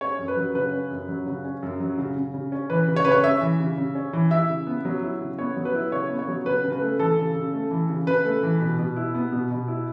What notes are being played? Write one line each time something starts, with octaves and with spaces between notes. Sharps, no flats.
C#4 C#5
F#2
B4
F#3
C#3 B4
C#4
F#2
F#3
C#3
C#4
F#2
F#3
C#3
C#3
C#3
C#4
E3 B4
C#3
C#5
C#3 B4
C#5
C#4 E5
E3
C#3
C#3
C#4
E3
E4 E5
C#3
B3
F#3
E4
C#3
B3 C#5
F#3
B4
E4
C#3 C#5
B3
C#5
F#3
C#3 B4
C#3
B4
A3
E3 A4
C#3
C#3
A3
E3
C#3
C#3 B4
A3
E3
B2
B2
E4
B3
B2
B2
E4